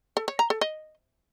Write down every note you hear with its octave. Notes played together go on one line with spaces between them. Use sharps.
A4
C#5
A#5
A4
D#5